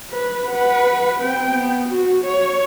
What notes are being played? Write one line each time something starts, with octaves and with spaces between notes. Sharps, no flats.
B4
B4 F#5
C4 G5
B3
F#4
C#5